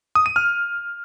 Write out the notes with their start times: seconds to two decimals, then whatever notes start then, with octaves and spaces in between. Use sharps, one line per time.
0.15 D#6
0.26 D#7
0.36 F6